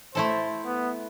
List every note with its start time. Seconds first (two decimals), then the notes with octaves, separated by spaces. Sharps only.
0.15 A3 E4 A4 C5
0.66 B3